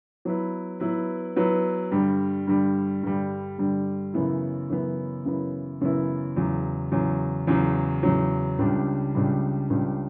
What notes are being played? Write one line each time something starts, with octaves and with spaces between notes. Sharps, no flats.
F#3 B3 E4 B4
F#3 B3 E4 B4
F#3 B3 E4 B4
G2 D3 G3
G2 D3 G3
G2 D3 G3
G2 D3 G3
F#2 C#3 E3 B3 E4
F#2 C#3 E3 B3 E4
F#2 C#3 E3 B3 E4
F#2 C#3 E3 B3 E4
E2 C#3 F#3
E2 C#3 F#3
E2 C#3 F#3
E2 C#3 F#3
C#2 C#3 G3 D4
C#2 C#3 G3 D4
C#2 C#3 G3 D4